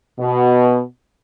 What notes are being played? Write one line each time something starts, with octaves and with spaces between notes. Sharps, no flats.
B2